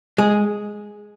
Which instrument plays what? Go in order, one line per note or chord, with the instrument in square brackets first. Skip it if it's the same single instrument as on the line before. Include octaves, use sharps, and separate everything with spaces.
[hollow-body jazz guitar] G#3 [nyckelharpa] G#4